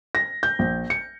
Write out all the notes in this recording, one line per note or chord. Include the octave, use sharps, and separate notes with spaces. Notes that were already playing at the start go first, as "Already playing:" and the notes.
A#6
G6
A#1
C#7